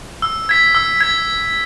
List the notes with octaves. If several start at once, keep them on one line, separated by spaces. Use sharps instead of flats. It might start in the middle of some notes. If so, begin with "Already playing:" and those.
E6
G#6 B6
E6
G#6 B6